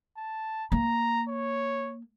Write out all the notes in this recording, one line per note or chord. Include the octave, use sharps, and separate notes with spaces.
A5
A#3 A#5
C#5